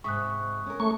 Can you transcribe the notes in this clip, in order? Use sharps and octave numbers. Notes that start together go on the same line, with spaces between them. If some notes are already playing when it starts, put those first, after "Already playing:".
G#2 C3 E5 C#6 D#6 F#6
C#4 A#4
A3 A#5 C#6